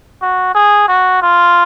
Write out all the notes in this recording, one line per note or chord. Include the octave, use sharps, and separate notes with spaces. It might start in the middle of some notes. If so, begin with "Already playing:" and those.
F#4
G#4
F#4
F4